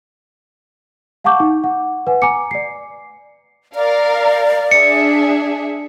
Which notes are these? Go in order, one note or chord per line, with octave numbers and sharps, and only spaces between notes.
F5 F#5 A5 C#6 D6 G6
D#4
F#5
B4 F#5 G#5
G#5 A#5 D6 C#7
D5 C7
A#4 D5 F5
D4 G#4 E5 C#7